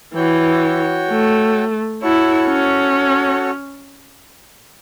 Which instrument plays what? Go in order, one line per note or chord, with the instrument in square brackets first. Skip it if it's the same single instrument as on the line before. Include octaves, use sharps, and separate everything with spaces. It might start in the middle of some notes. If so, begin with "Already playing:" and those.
[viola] E3 [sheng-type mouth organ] F#4 C#5 G5
[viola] A3
[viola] E4 [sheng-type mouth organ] F#4 A4 C#5
[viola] C#4